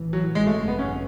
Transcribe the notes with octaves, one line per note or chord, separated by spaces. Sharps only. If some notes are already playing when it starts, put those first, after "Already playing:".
Already playing: A1 A2 E3
F#3
G#1 F#2 C#3 G#3
A3
B3
C#4